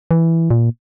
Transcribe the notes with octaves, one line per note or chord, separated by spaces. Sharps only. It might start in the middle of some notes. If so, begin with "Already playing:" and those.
E3
A#2